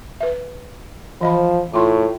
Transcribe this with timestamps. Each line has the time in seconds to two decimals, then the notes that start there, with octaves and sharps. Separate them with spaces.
0.21 B4 E5
1.21 E3 F3 D#5 B5
1.74 A2 F4 C6 C#6